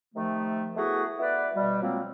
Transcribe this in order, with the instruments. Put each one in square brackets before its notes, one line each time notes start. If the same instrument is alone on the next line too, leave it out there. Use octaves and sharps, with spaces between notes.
[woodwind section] C3 D#3 F3 A3
A3 B3 E4 F#4 G#4 B4
B3 E4 B4 D5
B2 G3
F3 F#3 G#3 A#3 C4